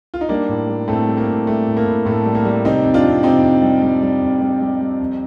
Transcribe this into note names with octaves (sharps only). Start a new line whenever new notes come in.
F4
D#4
G3 A#3 D4
A2
G3
A2 A3 C4
G3
A#3
A2
G3 A3
A2
A#3
A2
A2 A3
G3
A#3
G3
C3 C4 D#4
F2
D4 F4
F2
C3 C4 D#4
F2
G3
G3
G3
F2
G3
G3
G3
F2